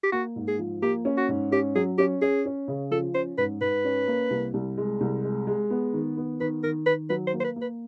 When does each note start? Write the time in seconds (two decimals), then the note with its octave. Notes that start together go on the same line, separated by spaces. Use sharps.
0.04 G4
0.12 A#3 F#4
0.36 G#2
0.48 G#4
0.59 F3
0.82 A#3 G4
1.05 C#4
1.17 F#4
1.29 G#2
1.52 C#4 G4
1.76 F#3 G#4
1.98 C#4 G4
2.22 C#4 G#4
2.45 C#4
2.68 C#3
2.91 F3 A4
3.15 C#4 C5
3.38 G#2 B4
3.61 G#2 B4
3.84 C#4
4.08 A#3
4.30 C2
4.54 C2
4.78 G#3
5.01 C2
5.24 G#3
5.47 G#3
5.70 B3
5.93 D#3
6.17 B3
6.40 D#3 B4
6.63 D#3 A#4
6.86 D#3 B4
7.10 F#3 B4
7.27 C5
7.33 A#3
7.40 C5
7.44 B4
7.56 A#3
7.61 B4